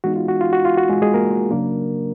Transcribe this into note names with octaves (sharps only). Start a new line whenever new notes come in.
E3 G#3 B3 D#4 F#4
F4
F#4
F4
F#4
F4
F#4
G#3 G#4
G#3 G#4
A#3 A#4
C#3 F#3 A#3 D4